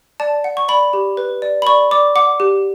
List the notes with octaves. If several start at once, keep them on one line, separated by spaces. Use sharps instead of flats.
D5 A5
F#5
C#6
D5 B5
G4
B4
D5
B5
D5 C#6
D5 D6
F#5 D6
G4